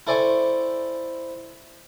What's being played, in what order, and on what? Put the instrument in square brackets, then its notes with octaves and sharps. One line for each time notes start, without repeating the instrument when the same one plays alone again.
[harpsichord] E4 A4 C5 D5 G#5 C#6